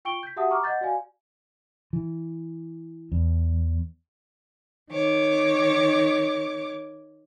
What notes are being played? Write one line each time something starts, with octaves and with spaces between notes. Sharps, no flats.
F4 G5 C#6 D7 G7
G6 B6
F#4 G4 E5 F#5 A5 D#6
A#5 C#6 D6 F6
D#5 F#5 G6 A6
F#4 D5 F5 G#5
E3
E2
D#3 C#5 D6